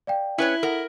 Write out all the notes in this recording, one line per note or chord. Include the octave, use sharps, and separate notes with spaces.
D5 F5 G5
C#4 E4 B4 C#5
A4 A#4 F#5